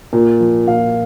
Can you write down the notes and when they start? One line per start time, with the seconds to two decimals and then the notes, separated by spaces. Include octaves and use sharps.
0.13 A#2
0.40 F3
0.68 A#2 F5